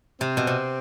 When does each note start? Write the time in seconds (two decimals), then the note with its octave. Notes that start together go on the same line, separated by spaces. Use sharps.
0.21 C3 C4
0.37 B2
0.47 C3